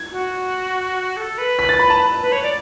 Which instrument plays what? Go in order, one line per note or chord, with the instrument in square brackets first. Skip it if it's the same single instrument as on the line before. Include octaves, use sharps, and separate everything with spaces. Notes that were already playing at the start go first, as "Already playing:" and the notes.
Already playing: [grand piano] G#6
[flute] F#4
A4
B4
[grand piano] B6
A6
B5
A5
[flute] B4
C#5
D5